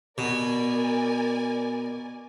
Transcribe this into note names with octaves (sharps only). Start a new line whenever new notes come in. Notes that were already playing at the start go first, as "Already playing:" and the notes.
B2 A#4 D5 G#5